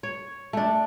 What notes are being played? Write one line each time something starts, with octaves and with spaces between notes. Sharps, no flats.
C#5
A3 D4